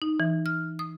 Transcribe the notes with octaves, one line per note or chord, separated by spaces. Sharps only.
D#4
E3
F6
D#6